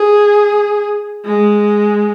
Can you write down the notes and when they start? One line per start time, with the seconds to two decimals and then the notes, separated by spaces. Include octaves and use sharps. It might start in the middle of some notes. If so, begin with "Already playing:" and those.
Already playing: G#4
1.25 G#3